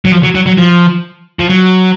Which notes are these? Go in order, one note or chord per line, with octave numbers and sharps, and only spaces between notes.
F#3
F3
F#3
F#3
F#3
F3
F3
F#3